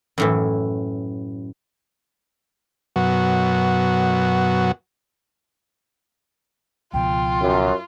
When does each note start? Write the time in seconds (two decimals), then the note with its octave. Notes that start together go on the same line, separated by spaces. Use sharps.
0.18 F#2 A2 E3
2.96 F#2 B2 F#3
6.94 C#2 B2 F3 F4 G5
7.42 F#2